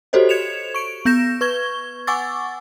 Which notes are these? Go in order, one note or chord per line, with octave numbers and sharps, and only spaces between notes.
F#4 G4 A4 C5 C#5 D#5
G#6 C#7 E7 F7
C#6 D7
B3 G6 A#6 E7
B4 C#6 G#6 G7
F#5 G#5 C#6 D6 E6 A6